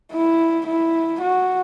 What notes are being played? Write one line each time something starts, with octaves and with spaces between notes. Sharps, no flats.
E4
E4
F#4